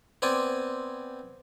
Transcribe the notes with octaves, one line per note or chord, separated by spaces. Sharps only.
B3 C4 D5 G#5